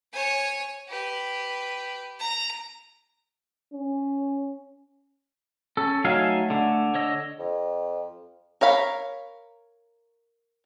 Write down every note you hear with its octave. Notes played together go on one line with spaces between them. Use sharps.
C#5 G#5
G4 B4
A#5
C#4
C#4 A4
F#3 A3 D#4 E5 F5 G#5
D3
C#5 D#5 E6
F2
A#4 C#5 F5 B5